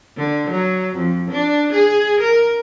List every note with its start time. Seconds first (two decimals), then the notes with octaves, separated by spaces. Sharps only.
0.17 D3
0.50 F#3
0.96 F2
1.31 D4
1.73 G#4
2.21 A#4